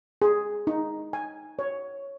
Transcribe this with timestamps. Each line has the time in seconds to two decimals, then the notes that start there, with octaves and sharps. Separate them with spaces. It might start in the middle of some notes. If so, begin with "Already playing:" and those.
0.22 G#4
0.67 D#4
1.13 G#5
1.59 C#5